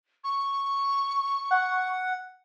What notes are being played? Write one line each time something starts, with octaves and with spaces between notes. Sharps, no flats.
C#6
F#5